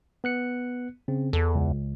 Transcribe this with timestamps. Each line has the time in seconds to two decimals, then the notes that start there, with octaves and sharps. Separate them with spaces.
0.24 B3 F#6 C#7
1.08 C#3 C4
1.33 E2 A4
1.55 C#2